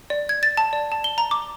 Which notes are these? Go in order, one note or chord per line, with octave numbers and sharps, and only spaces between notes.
D5
G#6
A6
A5
D5
A5
G7
A#5
D6